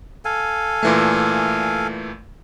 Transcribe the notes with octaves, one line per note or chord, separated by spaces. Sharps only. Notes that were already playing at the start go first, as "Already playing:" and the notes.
A4 F5 G#5
A#2 E3 A3